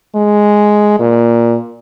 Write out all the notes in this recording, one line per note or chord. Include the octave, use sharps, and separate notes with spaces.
G#3
A#2